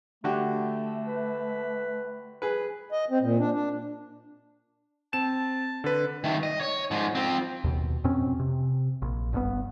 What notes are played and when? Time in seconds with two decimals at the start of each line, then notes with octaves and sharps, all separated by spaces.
0.24 D3 A3 F#4 G4
1.06 B4
2.42 G#4 B4
2.92 D#5
3.10 C4
3.22 A#2
3.39 D4
3.53 D4
5.13 C4 A5 E7
5.84 D3 B4
6.24 D#3 A3
6.43 D#5
6.61 C#5
6.91 G#2 F3
7.15 F3 C4
7.64 D#2 B2
8.04 F2 B2 C4 C#4
8.39 C3
9.02 A#1
9.33 F#1 G2 B3